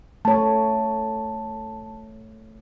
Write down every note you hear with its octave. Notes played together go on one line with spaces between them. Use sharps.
A3 C#5 A5